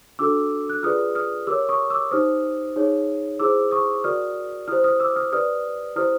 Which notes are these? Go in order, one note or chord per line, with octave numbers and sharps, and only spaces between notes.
D4 F#4 A4 D6 E6
F#6
F4 G#4 B4 D5 D#6 F6
D#6 F6
G4 A#4 C#5 D6 E6
C#6 D#6
D6 E6
D#4 G4 C5 D#6 F6
D#4 G#4 C#5
E4 G#4 C5 D6 E6
C#6 D#6
F#4 A#4 D5 D#6 F6
E4 G4 C5 D#6 F6
D#6 F6
D6 E6
D#6 F6
G4 B4 D5 D#6 F6
E4 G4 C5 D#6 F6